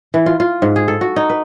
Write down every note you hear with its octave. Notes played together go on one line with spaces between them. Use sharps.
E3
F4
F4
G#2
G#4
A4
F#4
D#4
B4